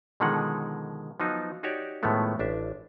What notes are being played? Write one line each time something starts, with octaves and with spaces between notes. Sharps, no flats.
B2 D3 D#3 F3 G#3 F#5
F3 F#3 B3 D#4 F4 F#4
D#4 F#4 G4 C#5 D5
A2 D#3 F3 G#3 A3 B3
A1 D4 E5